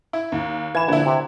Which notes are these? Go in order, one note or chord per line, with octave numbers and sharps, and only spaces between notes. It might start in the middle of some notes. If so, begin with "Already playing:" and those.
E4
D#2
E3 G#6 E7
A#1 D3 E4
C3